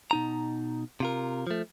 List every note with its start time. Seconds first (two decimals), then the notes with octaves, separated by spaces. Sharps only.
0.11 B2 D#4 A#5
1.00 C3 F4 A#4
1.47 F3 A3